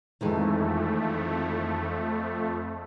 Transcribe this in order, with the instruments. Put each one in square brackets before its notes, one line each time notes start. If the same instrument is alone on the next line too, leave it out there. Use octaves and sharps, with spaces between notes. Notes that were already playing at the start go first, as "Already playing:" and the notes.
[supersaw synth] F2 A3 [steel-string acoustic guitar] D#3 E3 G#3